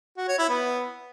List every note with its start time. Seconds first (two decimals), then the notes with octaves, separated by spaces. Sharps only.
0.17 F#4
0.28 C#5
0.38 E4
0.49 B3